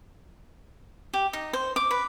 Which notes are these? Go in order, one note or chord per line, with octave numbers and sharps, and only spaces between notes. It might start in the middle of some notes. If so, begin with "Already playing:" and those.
G4
D#4
C5
D6
B4